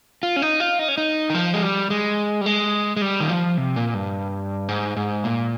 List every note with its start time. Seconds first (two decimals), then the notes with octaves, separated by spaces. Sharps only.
0.23 F4
0.36 C#4
0.42 D#4
0.60 F4
0.79 D#4
0.88 C#4
0.98 D#4
1.30 D#3
1.35 F3
1.53 G#3
1.62 G3
1.90 G#3
2.41 G3
2.46 G#3
2.97 G#3
3.02 G3
3.20 D#3
3.29 F3
3.57 C3
3.76 A#2
3.94 G2
4.68 G#2
4.97 G#2
5.24 A#2